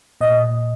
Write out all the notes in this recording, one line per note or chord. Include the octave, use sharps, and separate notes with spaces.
A#2 D#5